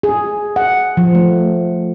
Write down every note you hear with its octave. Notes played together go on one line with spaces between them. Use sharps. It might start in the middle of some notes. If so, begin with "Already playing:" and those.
G#4
F#5
F3
A3